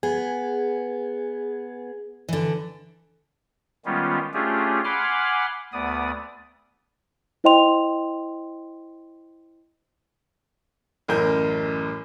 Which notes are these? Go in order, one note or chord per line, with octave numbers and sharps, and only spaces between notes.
B3 G#4
D3 E3
D#3 G3 G#3 B3 C#4 F4
A3 C#4 D4 F4 G4 G#4
F#5 G#5 B5 C6 D6 F6
D2 B3 D5 D#6
E4 C5 D#5 G5 C6 F7
A1 F#2 A#4 G6